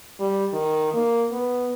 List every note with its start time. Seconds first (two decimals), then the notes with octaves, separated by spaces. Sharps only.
0.20 G3
0.53 D#3
0.94 A#3
1.31 B3